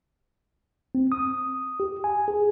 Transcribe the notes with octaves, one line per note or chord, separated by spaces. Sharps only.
C4
D#6
G4
G#5
G#4